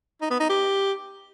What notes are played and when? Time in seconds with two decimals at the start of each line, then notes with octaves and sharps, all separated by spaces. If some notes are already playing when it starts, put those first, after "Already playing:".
0.21 D#4
0.31 B3
0.40 D#4
0.49 G4